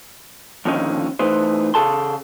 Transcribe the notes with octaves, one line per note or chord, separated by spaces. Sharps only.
F2 A#2 D3 D#3 C#4 D#4
E3 A3 D#4 B4 C5
C#3 G#4 A4 A5 C6